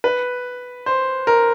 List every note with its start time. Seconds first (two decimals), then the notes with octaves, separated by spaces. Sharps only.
0.04 B4
0.86 C5
1.27 A#4